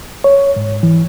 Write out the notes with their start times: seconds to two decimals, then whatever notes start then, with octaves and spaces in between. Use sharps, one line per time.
0.24 C#5
0.56 G#2
0.83 E3